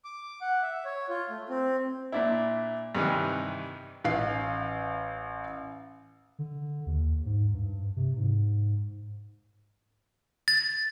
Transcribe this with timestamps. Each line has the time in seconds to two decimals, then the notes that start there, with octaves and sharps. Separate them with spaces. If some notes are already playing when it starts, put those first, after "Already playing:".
0.05 D6
0.41 F#5
0.62 E5
0.85 C#5
1.10 F4
1.30 A3
1.49 C4
2.12 A#2 D4 E4
2.95 G2 C3 D#3 E3
4.04 A1 F5 C7
6.39 D3
6.86 D#2
7.26 G#2
7.54 G2
7.96 C3
8.16 G#2
10.48 A6